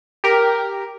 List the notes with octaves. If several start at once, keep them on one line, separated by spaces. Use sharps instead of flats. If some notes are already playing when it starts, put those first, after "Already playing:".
G4 A#4